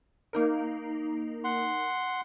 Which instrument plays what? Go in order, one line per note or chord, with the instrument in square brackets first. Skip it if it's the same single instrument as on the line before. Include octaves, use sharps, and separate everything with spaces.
[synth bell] A#3 D#4 A#4
[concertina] F#5 C6